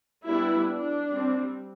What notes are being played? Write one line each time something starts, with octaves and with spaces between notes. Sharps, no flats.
G3 B3 D4 E4
D4
G3 C4